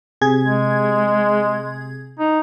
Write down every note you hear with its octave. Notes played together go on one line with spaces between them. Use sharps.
C3 G#4 G#6
G#3
D#4